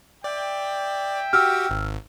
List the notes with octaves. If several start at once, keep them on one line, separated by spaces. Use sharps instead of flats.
D5 E5 G5
F#4 G4 E6 F6
G#1